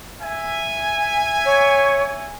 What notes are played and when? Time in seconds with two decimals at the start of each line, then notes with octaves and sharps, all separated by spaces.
0.22 E5 G#5
1.45 C#5